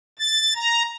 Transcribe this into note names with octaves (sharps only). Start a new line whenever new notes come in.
A6
A#5